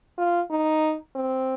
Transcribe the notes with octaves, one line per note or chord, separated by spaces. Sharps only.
F4
D#4
C4